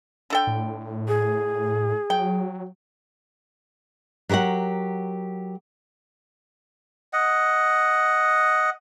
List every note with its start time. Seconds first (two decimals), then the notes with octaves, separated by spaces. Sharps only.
0.30 D3 A4 G5
0.47 A2
1.08 G#4
2.10 F#3 G5
4.29 F#3 G4 A#4 C#5 F#5
7.13 D#5 F#5